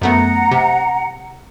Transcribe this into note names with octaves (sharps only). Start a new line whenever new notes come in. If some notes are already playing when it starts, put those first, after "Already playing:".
F#2 A3 B3 F#5 A#5
C3